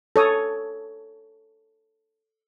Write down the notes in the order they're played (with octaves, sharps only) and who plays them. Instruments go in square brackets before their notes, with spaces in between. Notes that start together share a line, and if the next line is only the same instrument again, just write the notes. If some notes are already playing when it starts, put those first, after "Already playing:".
[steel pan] A4 C#5 D#6